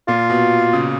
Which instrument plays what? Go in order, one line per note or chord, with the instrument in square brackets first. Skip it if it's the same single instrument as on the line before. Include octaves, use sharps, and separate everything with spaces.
[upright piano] A#2 [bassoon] F4
[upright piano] B2
C#3